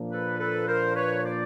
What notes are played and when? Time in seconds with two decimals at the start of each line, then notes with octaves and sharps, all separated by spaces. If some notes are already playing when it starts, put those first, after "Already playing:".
Already playing: A#2 F3 A#3 D4
0.12 A4 B4
0.40 A4 B4
0.68 A#4 C5
0.96 B4 C#5
1.25 C5 D5